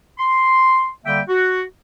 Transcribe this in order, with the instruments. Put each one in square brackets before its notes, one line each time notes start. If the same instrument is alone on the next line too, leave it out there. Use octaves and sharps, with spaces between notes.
[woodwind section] C6
D3 G3 A#3 E5 G5
F#4